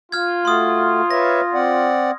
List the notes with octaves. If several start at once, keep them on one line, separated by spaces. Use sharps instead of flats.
F4 F6 G#6
A3 F#4 C6 D#6
B4 C#5 E5 A#6
C4 D5 F#5